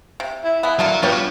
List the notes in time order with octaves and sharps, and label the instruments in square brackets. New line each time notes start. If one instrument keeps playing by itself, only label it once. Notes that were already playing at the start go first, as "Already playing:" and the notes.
[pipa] C3
[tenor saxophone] E4
[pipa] G#3 B3
[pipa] B2 D3 A#3 [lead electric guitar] F#3
[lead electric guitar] G3 D4 [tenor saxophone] B3 [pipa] F4 C#5 G5